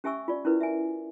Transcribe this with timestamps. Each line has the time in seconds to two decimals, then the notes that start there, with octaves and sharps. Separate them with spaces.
0.04 C#4 G4 E5 G#5 C#6 E6
0.28 F4 D5
0.45 C#4 E4 A#4 B4
0.61 E5 G#5